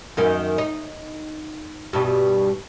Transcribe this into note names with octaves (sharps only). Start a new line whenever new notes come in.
F#2 D#3 A#3
D#4
G2 B2 G3